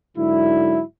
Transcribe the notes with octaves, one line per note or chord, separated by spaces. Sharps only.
G#2 D3 F#3 E4